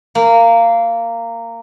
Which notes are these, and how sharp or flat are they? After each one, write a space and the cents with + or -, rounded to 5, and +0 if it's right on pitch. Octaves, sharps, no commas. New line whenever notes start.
A#3 -15